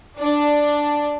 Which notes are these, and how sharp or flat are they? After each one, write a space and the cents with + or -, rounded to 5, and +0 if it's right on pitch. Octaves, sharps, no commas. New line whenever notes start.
D4 +0